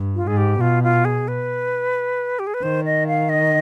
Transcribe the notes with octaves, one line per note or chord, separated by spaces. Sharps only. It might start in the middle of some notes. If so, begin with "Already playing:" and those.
Already playing: G2
F4
G#2 G#4
G4
B2 F4
F4
G#4
B4
G4
G#4
B4
D#3 C5
D#5
F5
D#5